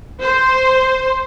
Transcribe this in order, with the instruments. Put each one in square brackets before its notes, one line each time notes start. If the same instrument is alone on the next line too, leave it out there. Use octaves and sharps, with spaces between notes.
[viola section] C5